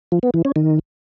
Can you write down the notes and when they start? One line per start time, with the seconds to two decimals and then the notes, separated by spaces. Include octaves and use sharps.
0.12 F3
0.23 B3
0.34 E3
0.45 C#4
0.56 D#3